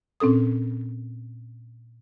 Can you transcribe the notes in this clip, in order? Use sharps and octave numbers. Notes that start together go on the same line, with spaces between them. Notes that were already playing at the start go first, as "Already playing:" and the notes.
A#2 C4 C#4 A4 D#6